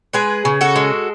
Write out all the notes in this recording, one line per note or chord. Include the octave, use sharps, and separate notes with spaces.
G#3 G#4 B4
C#3
F#4 A4
G#3